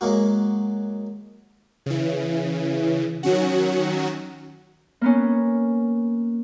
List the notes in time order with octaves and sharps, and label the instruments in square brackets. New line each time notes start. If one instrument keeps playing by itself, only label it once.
[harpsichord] F#3 G#3 A#3 F#4
[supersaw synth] C#3 E3
D#3 F#3 C#4 F#4
[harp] A#3 B3 C#4